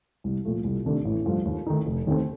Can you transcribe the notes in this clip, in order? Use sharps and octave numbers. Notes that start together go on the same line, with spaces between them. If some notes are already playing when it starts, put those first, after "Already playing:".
C2
A#2 F3 A3
C2
C3 D#3 A3 D4
A1
G2 F3 A3
D#2
D#3 A3 D#4
F1
D#2 D#3 A3 C4